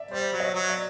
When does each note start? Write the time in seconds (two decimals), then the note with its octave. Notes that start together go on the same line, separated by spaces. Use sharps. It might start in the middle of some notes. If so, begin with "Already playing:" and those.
Already playing: D5 E5
0.11 G3 C5 D5
0.33 F#3
0.40 C#5 D#5
0.55 F#3
0.69 D5 E5